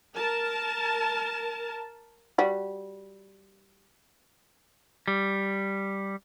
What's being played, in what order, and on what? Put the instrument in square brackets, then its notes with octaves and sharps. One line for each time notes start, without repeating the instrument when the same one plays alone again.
[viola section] A#4 A5
[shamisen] G3 F#4
[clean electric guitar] G3